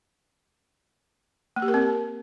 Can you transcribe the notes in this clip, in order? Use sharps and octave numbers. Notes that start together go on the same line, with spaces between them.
A#3
G4
A#4
C4